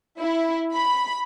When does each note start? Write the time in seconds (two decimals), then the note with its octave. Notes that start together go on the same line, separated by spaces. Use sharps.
0.20 E4
0.76 B5